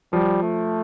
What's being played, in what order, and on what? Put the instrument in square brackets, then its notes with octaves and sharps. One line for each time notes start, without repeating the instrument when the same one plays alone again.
[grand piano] F3 [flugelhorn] G3
[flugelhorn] A3